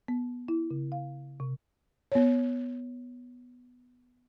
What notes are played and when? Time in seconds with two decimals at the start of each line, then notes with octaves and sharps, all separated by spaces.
0.08 B3
0.48 E4
0.71 C#3
0.92 F5
1.40 C3
2.12 B3 C#5